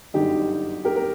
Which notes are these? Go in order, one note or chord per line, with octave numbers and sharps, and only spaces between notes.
G1 F#2 D3 D#4 G4
G4 A#4
A#4